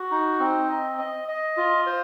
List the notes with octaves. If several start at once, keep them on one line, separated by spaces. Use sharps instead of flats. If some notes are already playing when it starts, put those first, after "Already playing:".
Already playing: F#4
D#4
C4
D#5
D#5
D#5
F4
C5